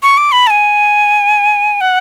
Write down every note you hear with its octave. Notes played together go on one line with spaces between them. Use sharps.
C#6
D6
B5
A5
G#5
F#5